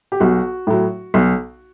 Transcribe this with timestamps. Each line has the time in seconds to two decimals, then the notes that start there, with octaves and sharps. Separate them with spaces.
0.12 G4
0.20 B1 F#4
0.67 A2 F#3
1.14 B1